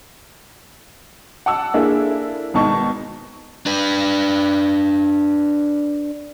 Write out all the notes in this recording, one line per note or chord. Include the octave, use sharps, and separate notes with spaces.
F#5 A5 D6 E6
A#3 D4 E4 G#4 A4
G#1 B2 D#4 A5 C#6
D4 B4